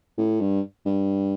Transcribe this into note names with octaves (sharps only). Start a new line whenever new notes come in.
A2
G2
G2